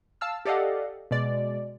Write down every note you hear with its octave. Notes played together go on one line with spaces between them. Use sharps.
F5 A5 E6 F6
G4 A4 D5 D#5 F5 F#5
B2 G#3 D5